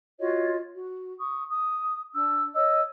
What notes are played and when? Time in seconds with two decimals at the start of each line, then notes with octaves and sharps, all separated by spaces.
0.18 F4 F#4 C#5 D#5
0.73 F#4
1.18 C#6 D#6
1.49 D#6
2.13 D4 E6
2.55 C#5 D#5 E6